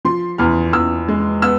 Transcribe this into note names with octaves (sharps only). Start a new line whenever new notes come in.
F3 C6
E2 F6
E2 E6
G#3
B3 E6